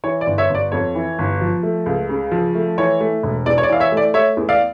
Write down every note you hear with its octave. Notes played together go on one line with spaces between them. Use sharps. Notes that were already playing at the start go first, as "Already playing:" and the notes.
E3 C#5
D5
G1
C#5 E5
G1
D5
F2 C#5
E3
G1
F3
A3
C#2
C#3
F3
A3
E3 C#5
A3
E1
E2 D5
C#5
D5
E3 F5
C#5 E5
A3
D5
A3 C#5 E5
E2
D5 F5